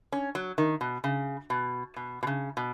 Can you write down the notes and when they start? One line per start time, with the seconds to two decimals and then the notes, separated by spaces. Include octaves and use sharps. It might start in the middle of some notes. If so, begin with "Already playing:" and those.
0.12 C#4
0.35 F#3
0.58 D#3
0.81 B2
1.04 C#3
1.50 B2
1.96 B2
2.23 B2
2.27 C#3
2.57 B2